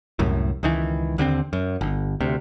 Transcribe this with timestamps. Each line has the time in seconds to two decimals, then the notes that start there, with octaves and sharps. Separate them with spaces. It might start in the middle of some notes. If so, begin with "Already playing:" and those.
0.19 C2 F#2 A2
0.63 C#2 D#3 E3
1.18 D#2 D3 A3 C4
1.53 F#2
1.81 G1
2.20 D2 C3